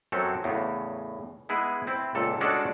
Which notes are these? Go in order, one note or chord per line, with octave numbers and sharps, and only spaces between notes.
F#2 F#3 C4 C#4 A4
E2 A2 C#3
G#3 B3 E4 G#4
C4 E4
C#2 A#2 A4
G#3 C#4 D4 F#4 A4 D5